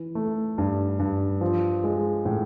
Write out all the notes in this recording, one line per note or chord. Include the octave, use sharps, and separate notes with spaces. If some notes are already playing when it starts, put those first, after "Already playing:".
Already playing: E3
A3
G2
G2
F3
G#3
A2